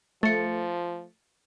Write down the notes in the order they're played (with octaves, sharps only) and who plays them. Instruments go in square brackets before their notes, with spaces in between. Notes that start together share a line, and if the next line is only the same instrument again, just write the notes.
[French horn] F3 [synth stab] A3 [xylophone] A6 C#7